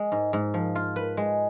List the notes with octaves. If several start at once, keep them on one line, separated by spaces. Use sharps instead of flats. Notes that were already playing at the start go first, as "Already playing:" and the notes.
Already playing: G#3
G#2
G#2
F3
F4
B4
G#3